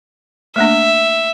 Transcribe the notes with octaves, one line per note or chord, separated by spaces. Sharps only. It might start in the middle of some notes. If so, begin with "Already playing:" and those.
A3 A#3 D4 E5